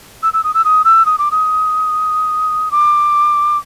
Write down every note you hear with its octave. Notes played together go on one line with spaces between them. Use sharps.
E6
E6
D#6
E6
D#6
E6
D#6
D6
D#6
D6